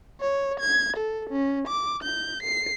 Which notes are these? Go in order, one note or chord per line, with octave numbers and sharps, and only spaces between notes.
C#5
G#6
A4
C#4
D6
G6
C7